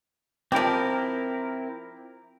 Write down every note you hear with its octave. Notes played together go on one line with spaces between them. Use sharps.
F3 C4 E4 G4 A#4